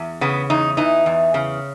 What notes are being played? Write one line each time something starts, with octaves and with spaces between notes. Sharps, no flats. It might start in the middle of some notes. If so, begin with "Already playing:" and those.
Already playing: E2
C#3 B3
E2 D#4
E3 D#4
E2
C#3